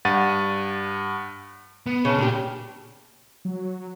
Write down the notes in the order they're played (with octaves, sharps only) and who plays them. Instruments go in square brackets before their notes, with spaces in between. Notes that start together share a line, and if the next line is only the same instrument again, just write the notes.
[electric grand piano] G2 F#5 A6 D#7
[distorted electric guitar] B3
[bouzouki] C#3 [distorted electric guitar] C#4 A5
[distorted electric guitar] A#2 [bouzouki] D4 G4
[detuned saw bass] F#3